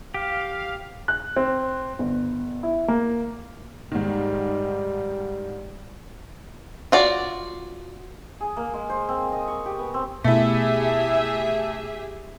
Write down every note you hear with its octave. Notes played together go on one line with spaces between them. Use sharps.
G4 F5
F#6
C4
G1
E4
A#3
G#2 D#3 G3
F4 F#4 D5
G#4
A#3
G#3
C5
C4
D#5
C#6
G4
B3
C4
B2 A3 E4 G4 G#4 E5